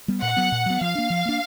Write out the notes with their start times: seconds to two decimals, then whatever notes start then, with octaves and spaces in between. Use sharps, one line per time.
0.08 G3 B3
0.22 A#2 F#5
0.36 F#3 B3
0.52 A#2
0.66 F#3 B3
0.81 F3 F5
0.95 A#3 D4
1.10 F3
1.25 A#3 D4